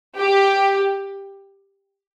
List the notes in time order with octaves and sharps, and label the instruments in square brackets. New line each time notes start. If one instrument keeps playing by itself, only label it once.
[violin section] G4